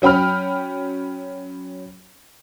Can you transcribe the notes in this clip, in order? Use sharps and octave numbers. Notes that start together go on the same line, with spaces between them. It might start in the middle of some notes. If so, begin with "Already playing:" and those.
F#3 C#4 G5 B5 F6